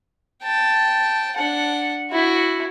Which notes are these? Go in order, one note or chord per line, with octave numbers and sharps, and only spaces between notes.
G5 A5
D4 F#5
E4 F#4